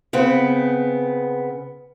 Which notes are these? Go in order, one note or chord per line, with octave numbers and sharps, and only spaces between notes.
C#3 B3 C4